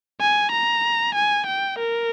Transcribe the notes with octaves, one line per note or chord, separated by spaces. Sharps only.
G#5
A#5
G#5
G5
A#4